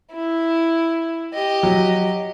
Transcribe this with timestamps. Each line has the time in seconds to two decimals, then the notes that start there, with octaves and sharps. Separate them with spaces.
0.12 E4
1.34 G4 D#5
1.63 F#3